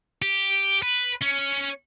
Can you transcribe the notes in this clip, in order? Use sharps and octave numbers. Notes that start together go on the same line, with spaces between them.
G4
B4
C#4